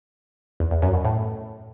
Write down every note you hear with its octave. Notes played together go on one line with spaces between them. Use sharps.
E2
E2
F#2
B2
A2